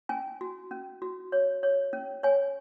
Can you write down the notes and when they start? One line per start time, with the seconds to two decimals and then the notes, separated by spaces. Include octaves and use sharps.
0.09 C#4 G#5
0.41 F#4
0.71 C#4
1.02 F#4
1.32 C#5
1.63 C#5
1.93 C#4
2.23 C#5 G#5